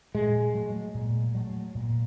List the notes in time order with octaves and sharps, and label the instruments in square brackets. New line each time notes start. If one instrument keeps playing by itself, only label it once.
[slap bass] A#2 [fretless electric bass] G#3
[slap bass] F#3 A3
A#2
F#3 A3
A#2